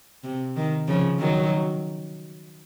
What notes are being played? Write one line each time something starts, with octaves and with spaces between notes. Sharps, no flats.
C3
D#3
C#3 F3
D#3 F#3